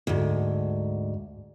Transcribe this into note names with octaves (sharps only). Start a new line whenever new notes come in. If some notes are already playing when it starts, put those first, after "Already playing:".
D2 G#2